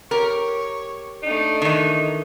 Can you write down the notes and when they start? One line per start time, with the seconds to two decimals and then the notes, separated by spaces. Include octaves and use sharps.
0.11 G4 A#4 C#5
1.23 A3 D4 D#4
1.62 D#3 E3 D#4